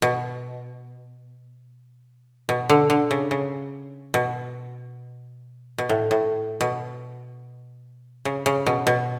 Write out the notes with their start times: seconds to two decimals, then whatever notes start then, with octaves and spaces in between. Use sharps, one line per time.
0.02 B2
2.49 B2
2.69 D3
2.90 D3
3.11 C#3
3.31 C#3
4.14 B2
5.78 B2
5.89 A2
6.11 A2
6.61 B2
8.25 C#3
8.46 C#3
8.66 B2
8.87 B2